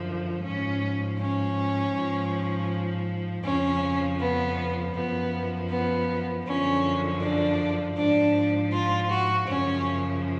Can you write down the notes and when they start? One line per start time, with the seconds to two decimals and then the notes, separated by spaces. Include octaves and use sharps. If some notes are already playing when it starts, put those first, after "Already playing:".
Already playing: F#2 D3 F3
0.43 G#2 F3 C#4
1.19 C#4
1.94 G#2 F3
3.45 F2 C#3 F3 C#4
4.21 B3
4.96 F#2 F3 B3
5.71 B3
6.46 F#2 D3 F3 C#4
7.21 D4
7.97 G#2 F3 D4
8.73 F4
9.10 F#4
9.48 F#2 C#3 F3 C#4